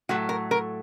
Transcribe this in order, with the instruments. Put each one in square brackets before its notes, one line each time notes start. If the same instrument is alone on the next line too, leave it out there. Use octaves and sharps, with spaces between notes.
[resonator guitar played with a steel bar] A2 F#3 A3 F#4
A#4
A#4